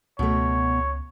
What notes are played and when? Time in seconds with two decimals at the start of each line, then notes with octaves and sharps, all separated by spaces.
0.19 C#2 B2 A3 C#5